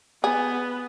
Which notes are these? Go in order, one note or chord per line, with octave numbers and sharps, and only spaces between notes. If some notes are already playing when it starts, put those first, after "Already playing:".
B3 G#4